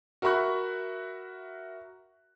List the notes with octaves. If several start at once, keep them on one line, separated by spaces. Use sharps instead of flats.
F#4 A#4 E5 B5 C#6 F#6